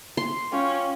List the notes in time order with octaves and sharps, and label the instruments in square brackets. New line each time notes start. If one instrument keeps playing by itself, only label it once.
[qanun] C6
[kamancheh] C#4 [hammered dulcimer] F4 G5 D6